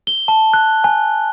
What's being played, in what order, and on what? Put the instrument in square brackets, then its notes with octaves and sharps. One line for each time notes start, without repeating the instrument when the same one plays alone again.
[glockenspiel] G7
A5
F#6
G#5